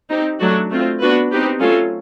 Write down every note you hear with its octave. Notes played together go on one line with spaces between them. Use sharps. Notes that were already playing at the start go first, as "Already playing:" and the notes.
C4 D#4 G4
F#3 A3 D4 F#4
A3 C4 F4
B3 D4 F#4 B4
C4 D#4 G4 B4
F#3 A3 C#4 F4 A4